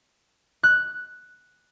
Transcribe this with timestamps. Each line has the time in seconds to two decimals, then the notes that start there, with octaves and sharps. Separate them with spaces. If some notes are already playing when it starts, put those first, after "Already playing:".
0.63 F#6